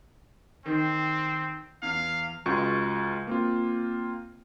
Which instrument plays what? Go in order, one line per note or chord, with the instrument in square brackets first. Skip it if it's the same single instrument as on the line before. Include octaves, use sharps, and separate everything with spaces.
[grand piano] D#3 [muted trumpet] C4
[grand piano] E2 [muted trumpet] F5
[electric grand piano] C#2 G#3 F4 F#4 C#6
A#3 C4 F4